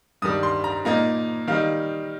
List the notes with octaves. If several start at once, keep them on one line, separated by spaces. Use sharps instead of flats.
G2 D#3 G3 D#6
C6
A#5
A#2 A#3 D#4 A#5
D#3 G3 D#4 F5